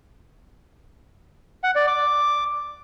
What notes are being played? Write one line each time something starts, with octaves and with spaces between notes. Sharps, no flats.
F#5
D5
D6